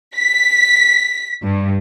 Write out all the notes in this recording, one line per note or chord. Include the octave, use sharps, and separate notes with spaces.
B6
G2